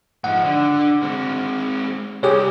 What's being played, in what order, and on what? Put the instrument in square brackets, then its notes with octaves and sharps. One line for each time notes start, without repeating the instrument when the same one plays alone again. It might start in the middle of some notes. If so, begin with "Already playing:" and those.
[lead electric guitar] G#2 F3 [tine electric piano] F#5
[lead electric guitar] D3
G#3 C4
[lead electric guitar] C2 [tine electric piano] G4 G#4 C#5